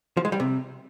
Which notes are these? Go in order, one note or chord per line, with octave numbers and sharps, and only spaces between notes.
F3
G#3
G3
C3